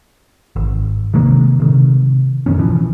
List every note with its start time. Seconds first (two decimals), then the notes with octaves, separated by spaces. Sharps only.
0.56 G#1
1.14 C3 D#3 G#3 A#3
1.60 C3 D#3
2.46 F#2 A2 D#3 C#4
2.59 B1 E3 F3